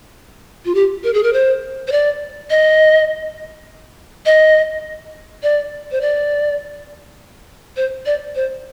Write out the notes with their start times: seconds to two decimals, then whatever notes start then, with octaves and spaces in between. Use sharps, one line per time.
0.65 F4
0.75 G4
1.04 A#4
1.14 G#4
1.23 A#4
1.33 C5
1.88 C5
1.92 D5
2.50 D#5
4.26 D#5
5.43 D5
5.91 C5
6.01 D5
7.77 C5
8.06 D5
8.35 C5